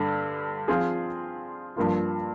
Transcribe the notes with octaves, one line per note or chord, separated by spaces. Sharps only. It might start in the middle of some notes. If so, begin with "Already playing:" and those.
Already playing: G2 D3
F3 C4 F4 G#4
G2 F3 A#3 F4